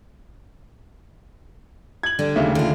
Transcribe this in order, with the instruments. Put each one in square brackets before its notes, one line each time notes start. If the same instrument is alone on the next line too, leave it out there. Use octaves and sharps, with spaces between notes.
[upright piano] G#6 F#7
[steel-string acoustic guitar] D3 G3 D4
[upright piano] D#2 C#3 A3
[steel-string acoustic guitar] D3 F4